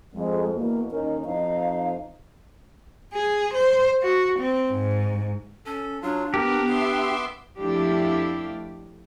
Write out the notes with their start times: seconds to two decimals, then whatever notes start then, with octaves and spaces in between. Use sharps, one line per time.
0.14 F2 G#3
0.56 E2 B2 A#3
0.91 D#2 C#4 D#4 A#4
1.25 F2 D#4 F5
3.13 G#4
3.54 C5
4.03 F#4
4.39 C4
4.71 G#2
5.66 C#4 A4
6.02 F#3 D4 F4
6.34 B3 G4 A#4
6.67 B3 E5 C6 D6
7.58 F2 A3 D4 E4 G4 F5